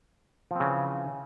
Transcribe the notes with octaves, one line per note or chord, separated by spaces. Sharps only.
C#3 E3 F3 C4